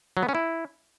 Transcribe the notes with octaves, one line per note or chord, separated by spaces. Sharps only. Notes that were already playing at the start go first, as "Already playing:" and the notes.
F#3
B3
C#4
E4